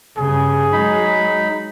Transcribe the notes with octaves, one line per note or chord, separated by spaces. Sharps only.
G2 C#3 G#4
F#3 G#3 D#4 B5